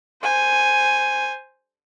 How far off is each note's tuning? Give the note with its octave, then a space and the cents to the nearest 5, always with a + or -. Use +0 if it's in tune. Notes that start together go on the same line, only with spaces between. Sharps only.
C5 +0 G#5 +0